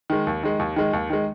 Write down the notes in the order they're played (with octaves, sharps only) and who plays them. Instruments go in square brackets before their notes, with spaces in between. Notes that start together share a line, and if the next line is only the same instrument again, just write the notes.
[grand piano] D#3 G#3
D#2
D#3 G#3
D#2
D#3 G#3
D#2
D#3 G#3